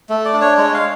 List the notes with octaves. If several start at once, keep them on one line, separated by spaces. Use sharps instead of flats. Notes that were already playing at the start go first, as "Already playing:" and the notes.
A3
D5
D4
C#5
G#3 C#5
F5